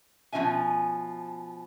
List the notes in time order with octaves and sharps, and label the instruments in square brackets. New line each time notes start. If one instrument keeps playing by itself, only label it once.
[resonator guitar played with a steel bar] B2 F3 C#4 E5 G#5